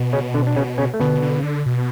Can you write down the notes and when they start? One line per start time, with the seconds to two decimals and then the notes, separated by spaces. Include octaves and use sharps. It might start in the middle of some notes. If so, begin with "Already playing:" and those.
Already playing: B2
0.13 C#3 C#4
0.34 D3 D4
0.47 D4
0.56 C#3 C#4
0.78 C#3 C#4
0.94 A3
1.00 B2 D3 B3
1.22 D3
1.39 C#3
1.43 D3
1.66 B2